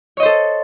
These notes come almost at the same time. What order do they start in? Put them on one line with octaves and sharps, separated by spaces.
C#5 D#5 C5 A4